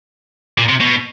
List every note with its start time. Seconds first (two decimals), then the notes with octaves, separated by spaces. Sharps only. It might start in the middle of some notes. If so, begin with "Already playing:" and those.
0.58 A#2
0.69 C3
0.81 B2